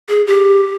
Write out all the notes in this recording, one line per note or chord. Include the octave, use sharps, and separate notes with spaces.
G#4
G4